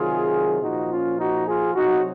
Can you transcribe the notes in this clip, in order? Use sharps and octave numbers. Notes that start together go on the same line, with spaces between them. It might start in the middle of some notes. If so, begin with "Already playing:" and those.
Already playing: C3 D#3 F#3 F4 G#4
A#2 F3 D#4 F#4
C#4 F4
D#4 F#4
F4 G#4
C3 F#3 D#4 F#4